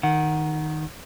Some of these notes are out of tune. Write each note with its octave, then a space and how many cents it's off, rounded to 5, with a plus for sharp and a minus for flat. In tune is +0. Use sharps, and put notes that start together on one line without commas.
D#3 +0 F#5 +0